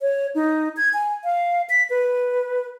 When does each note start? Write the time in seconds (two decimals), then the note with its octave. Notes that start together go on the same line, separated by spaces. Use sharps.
0.01 C#5
0.35 D#4
0.77 G#6
0.94 G#5
1.24 F5
1.70 B6
1.90 B4